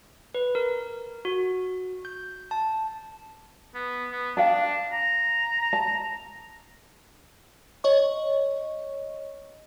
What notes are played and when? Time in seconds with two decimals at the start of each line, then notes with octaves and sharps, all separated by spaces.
0.35 B4
0.55 A#4
1.25 F#4
2.05 G6
2.51 A5
3.75 B3
4.12 B3
4.37 D4 F5 G5 A5
4.92 A#5
5.73 A5
7.84 C#5 D#5 C#6